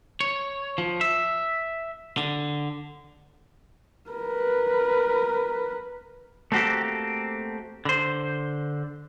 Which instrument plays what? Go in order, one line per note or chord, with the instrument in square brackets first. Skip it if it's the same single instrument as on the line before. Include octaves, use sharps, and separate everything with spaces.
[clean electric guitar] C#5
F3
E5
D3
[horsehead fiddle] A#4 B4
[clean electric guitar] A3 A#3 C4 F#4 G4 A4
D3 C5